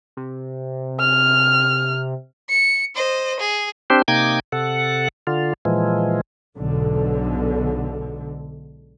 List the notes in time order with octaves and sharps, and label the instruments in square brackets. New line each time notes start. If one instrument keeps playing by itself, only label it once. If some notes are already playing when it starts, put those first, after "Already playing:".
[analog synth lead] C3
[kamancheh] F6
[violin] C#7
C5 D#5
G#4
[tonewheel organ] C4 D4 G4 C5
C3 A#3 D#4 G5 D6 G#6
C3 A4 F#5
D3 F4
A#2 E3 F3 G#3
[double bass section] B1 G#2 D3